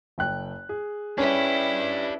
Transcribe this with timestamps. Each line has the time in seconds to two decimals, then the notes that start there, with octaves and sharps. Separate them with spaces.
0.18 F#1 G5 F#6
0.69 G#4
1.18 C#4 D4 E4 G4 B4